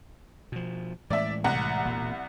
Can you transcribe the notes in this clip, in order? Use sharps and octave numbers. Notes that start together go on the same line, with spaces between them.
B2 F3
A2 E3 G#3 D5 E5
C2 F#5 A#5
E1 A#2